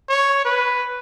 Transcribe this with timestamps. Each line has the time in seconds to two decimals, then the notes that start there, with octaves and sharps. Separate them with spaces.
0.09 C#5
0.45 B4